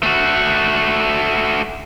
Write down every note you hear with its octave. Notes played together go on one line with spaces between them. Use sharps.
A3 F#4